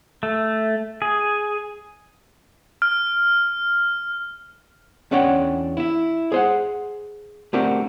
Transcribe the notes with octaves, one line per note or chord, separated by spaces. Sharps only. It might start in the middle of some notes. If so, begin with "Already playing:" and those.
A3
G#4
F6
E2 C#4 D4 C#5 F#5 G5
E4 E5
G#4 C5 F#5
A3 C4 D4 F#4 G4 A#4